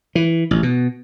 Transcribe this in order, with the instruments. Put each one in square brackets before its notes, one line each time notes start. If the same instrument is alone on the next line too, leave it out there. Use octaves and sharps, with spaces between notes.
[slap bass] E3
A1
B2